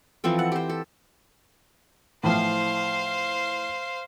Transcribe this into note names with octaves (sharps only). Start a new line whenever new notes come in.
E3 F3 C4 A4
F#5
G4 C5
A4
A2 E3 F3 C5 F5